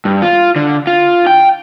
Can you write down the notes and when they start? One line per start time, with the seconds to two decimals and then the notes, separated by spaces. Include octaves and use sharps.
0.05 G2
0.22 F4
0.56 D3
0.87 F4
1.27 G5